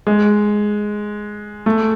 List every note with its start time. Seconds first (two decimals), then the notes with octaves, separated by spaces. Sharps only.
0.07 G#3
1.66 A3